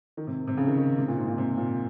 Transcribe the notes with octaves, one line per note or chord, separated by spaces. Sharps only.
D#3
C3
C3
C#3
D#3
D#3
C3
A#2
G#2
A#2
C3
A#2